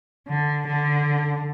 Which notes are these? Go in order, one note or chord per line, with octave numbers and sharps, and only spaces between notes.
D3
D3